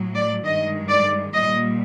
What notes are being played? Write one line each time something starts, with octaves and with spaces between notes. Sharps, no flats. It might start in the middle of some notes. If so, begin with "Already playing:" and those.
Already playing: A2 F#3
D5
G2 D#3 G#3 D#5
D5
A#2 G3 D#5